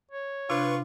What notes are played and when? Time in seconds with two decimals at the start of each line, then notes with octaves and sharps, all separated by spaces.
0.11 C#5
0.50 C3 D4 F4 B4 C#6